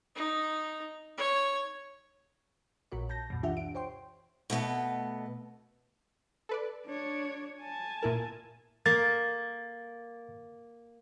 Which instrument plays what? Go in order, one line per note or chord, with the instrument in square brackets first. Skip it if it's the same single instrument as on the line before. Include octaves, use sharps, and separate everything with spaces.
[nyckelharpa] D#4
C#5
[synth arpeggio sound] A#1 A#2 F#4 C#5
A5 G6 A#6
C#2 F#2 B2
E3 D4 F4 G4 E5 F#5
D7
C5 C#5 G5 C6
[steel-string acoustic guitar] B2 A3 B3 D#5
[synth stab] A4 B4 D5
[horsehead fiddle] D4 C#5
G#5 A5
[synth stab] A#2 E4 A#4
[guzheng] A#3 [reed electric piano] A6